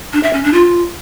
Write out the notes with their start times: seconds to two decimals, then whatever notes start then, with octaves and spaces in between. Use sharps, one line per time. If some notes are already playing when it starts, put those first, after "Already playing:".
0.13 D4
0.23 E5
0.33 C#4
0.43 D4
0.53 F4